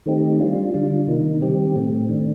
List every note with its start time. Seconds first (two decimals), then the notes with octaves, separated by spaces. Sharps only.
0.06 D#3 A3 C4 D#4 G4
0.40 G3 D4 F4
0.74 D3 G3 D4 F4
1.07 C3 D#3 A#3 D#4
1.42 D#3 G3 C4 G4
1.76 A2 A3 C4
2.09 D#3 A3 D4